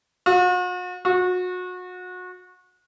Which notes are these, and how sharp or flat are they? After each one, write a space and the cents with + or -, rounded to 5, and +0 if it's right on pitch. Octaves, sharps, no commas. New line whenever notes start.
F#4 -45
F#4 -30